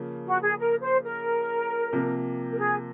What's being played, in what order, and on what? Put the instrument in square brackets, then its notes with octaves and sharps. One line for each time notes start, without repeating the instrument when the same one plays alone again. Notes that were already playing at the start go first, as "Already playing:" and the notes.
Already playing: [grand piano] C#3 F3 A#3
[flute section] F#4
G#4
A#4
C5
A#4
[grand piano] C3 F3 A#3
[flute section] A#4
G#4